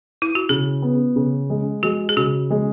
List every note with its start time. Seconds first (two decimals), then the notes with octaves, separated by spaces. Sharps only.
0.22 E4
0.35 F#4
0.49 C#3 G#4
0.82 B3
1.16 C#3
1.50 G#3
1.83 G#3 F#4
2.09 G#4
2.17 C#3 F#4
2.50 G#3